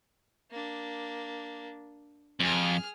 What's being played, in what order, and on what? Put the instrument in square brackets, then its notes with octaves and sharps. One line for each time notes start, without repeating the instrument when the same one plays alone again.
[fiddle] A#3 D4
[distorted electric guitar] F2 [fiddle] G#4 F6